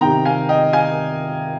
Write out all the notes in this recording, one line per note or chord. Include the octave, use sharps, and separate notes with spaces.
C3 D#3 G5 A#5
F5 G#5
D#5 G5
F5 G#5